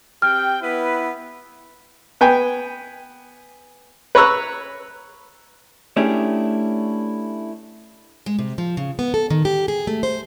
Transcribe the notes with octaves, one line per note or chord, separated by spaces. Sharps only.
C4 G4 G5 F6
B3 E4 B4
B3 G5 G#5
B4 C#5 A#5 C#6 E6 F#6
A3 C#4 D4 E4 G4 G#4
G#3
C3
F3
C#3
B3
A4
D#3
G4
G#4
A3
C5